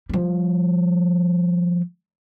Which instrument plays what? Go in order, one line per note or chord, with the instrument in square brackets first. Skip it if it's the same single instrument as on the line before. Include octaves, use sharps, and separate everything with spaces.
[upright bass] F3 G3